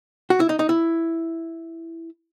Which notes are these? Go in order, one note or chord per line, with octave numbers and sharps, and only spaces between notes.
F#4
E4
D#4
D#4
E4